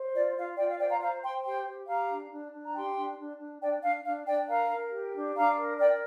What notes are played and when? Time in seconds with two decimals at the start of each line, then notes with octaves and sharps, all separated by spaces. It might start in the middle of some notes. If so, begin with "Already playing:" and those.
Already playing: C5
0.14 F4 D5
0.36 F4 F5
0.57 F4 D5 G5
0.69 F5
0.79 C5 D5 G5
0.90 F5 A#5
1.01 C5 F5 A#5
1.23 C5 G5 C6
1.44 G4 G5 C6
1.66 G4
1.88 G4 F5 A#5
2.10 D4
2.32 D4
2.53 D4
2.64 A#5
2.74 G4 G5 C6
2.97 D4
3.19 D4
3.40 D4
3.62 D4 D5 G5
3.83 D4 F5
4.05 D4 F5
4.26 D4 D5 G5
4.48 A#4 F5 A#5
4.70 A#4
4.91 G4
5.13 D4
5.35 D4 F5 A#5
5.57 A#4
5.79 A#4 D5 G5